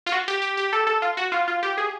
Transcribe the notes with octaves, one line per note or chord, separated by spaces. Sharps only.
F4
F#4
G4
G4
G4
A4
A4
F4
F#4
F4
F4
G4
G#4